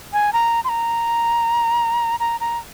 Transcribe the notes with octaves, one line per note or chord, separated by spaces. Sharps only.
G#5
A#5
C6
A#5
A#5
A#5